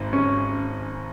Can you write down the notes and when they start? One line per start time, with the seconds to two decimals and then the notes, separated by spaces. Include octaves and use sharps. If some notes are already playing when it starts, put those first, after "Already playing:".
Already playing: G#1 G#2
0.13 C#4